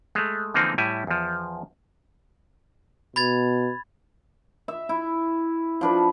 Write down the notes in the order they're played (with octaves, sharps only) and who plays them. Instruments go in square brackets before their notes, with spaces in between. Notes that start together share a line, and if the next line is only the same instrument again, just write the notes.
[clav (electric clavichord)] G#3 A3
D3 E3 F3 A#3 C4 D#4
A2 G3 E4 G#5
E2 F3
[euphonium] B2 [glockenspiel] B5 G#6 A6
[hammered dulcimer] E5
E4
F3 D4 B4